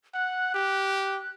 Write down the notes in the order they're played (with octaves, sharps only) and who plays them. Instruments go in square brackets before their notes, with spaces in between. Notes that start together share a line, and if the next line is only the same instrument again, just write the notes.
[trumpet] F#5 [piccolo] F#6
[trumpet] G4